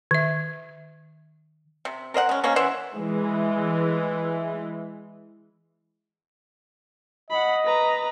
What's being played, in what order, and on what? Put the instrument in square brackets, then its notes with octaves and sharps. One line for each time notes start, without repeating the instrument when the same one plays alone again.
[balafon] D#3 E5
[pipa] C3
A#4 C5 D#5 F#5
G#3 C#4
B2 A#3 C#4
E3 C5 F#5
[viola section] E3 G#3
[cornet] D#5 [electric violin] F#5 B5
[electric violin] B4 A#5